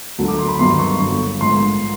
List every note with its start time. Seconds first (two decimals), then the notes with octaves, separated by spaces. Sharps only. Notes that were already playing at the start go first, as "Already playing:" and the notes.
0.18 D2 D3 F#3 A3
0.28 D6
0.39 C6
0.48 B5
0.59 G2 D#3 F#3 B3 C6
0.79 C#6
1.00 G1 G2 D3 C#6
1.41 A#1 G#2 F3 A3 C6